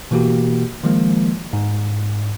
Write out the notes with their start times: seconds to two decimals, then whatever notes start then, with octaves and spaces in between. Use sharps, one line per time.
0.11 B2 E3 A#3 F#4 G4
0.84 D#3 F3 G#3 A#3
1.53 G#2